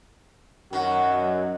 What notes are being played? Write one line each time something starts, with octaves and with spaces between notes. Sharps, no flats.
F#2 D#3 F#3 F#4